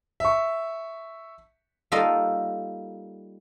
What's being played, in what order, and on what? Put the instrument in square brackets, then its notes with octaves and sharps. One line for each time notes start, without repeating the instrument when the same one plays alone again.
[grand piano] E5 C#6
[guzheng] G3 A#3 D#4 F4 A4 D#5